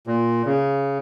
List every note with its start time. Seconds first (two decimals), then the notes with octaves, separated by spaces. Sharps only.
0.07 A#2
0.46 C#3